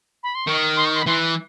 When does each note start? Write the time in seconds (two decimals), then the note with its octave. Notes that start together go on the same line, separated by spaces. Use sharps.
0.23 B5
0.35 C6
0.47 D#3 C#6
0.77 C6
0.86 C#6
0.95 C6
1.02 B5
1.07 E3 C6